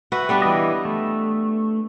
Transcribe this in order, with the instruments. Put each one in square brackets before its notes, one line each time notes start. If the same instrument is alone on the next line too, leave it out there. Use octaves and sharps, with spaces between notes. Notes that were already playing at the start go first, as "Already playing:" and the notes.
[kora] F#4 B4 E5
G3 B3 D4
[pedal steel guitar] E3 D#5
A3